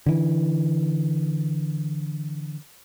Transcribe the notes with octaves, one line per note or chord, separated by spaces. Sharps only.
D3 E3